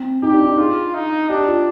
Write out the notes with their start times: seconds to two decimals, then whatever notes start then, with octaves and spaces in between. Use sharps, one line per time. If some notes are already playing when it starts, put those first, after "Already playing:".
Already playing: C4
0.22 D#4 G4
0.33 D4
0.45 D#4
0.58 F4 G#4
0.94 D#4
1.29 D4 G4
1.47 F4